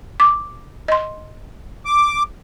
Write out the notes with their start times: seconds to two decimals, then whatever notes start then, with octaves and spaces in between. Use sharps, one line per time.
0.20 D6
0.88 D#5 C6
1.85 D6